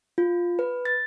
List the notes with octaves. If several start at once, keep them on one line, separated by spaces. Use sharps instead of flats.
F4
B4
A6